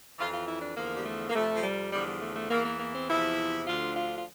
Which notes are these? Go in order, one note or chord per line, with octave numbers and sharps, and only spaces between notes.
F2 E3 F4
F4
E4
D4
E2 D3 F3 A#3
G3
A3
A#3
F2 C3 F3 A3
F3
G3
E2 D3 F3 G3
G3
A3
A3
E2 E3 A#3
A#3
A#3
C4
E2 C3 F3 E4
D2 D3 F3 F4
F4
F4